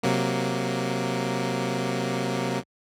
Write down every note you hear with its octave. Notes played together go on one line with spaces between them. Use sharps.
C3 F#3 A#3